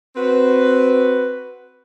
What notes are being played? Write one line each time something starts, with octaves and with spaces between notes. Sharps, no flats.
C4 F#4 B4